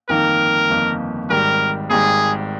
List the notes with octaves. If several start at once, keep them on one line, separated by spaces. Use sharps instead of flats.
G1 F2 D#3 A#3 D#4 A#4
G1 F2 D#3 A#3 D#4
G#1 G#2 D#3 G3 A#4
G#1 G#2 D#3 G3 G#4